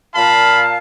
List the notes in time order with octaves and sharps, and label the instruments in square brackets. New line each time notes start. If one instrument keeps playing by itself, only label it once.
[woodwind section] A#2 F5 [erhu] A5 [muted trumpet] B5